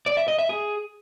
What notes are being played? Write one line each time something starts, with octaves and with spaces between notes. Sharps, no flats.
D5
E5
D#5
E5
G#4